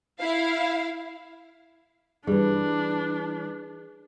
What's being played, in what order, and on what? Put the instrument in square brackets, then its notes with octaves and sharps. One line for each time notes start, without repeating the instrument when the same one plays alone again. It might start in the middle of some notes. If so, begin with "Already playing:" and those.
[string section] E4 F5
[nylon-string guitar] E3 G3 [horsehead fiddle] D4 [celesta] G#4